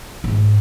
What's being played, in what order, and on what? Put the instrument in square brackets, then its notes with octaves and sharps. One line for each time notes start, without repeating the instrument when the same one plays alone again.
[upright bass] G#2